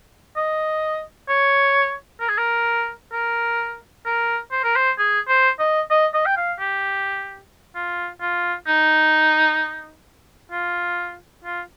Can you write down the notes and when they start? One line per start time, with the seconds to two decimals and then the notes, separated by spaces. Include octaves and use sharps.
0.37 D#5
1.29 C#5
2.20 A#4
2.29 G#4
2.38 A#4
3.13 A#4
4.06 A#4
4.52 C5
4.64 A#4
4.76 C5
4.98 G#4
5.28 C5
5.60 D#5
5.91 D#5
6.14 D#5
6.26 G5
6.37 F5
6.60 G4
7.75 F4
8.22 F4
8.67 D#4
10.52 F4
11.44 F4